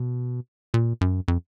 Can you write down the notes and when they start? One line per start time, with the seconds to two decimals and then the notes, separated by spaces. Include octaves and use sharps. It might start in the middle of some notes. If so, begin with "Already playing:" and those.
Already playing: B2
0.74 A#2
1.01 F#2
1.28 F2